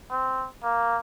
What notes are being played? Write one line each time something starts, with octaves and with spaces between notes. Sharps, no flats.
C4
A#3